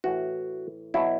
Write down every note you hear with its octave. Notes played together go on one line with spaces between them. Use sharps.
A2 E3 F#4
B2 F#3 E4